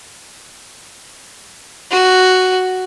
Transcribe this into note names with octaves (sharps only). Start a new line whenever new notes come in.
F#4